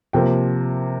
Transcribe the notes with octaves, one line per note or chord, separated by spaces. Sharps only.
C3 F3 A#3 G5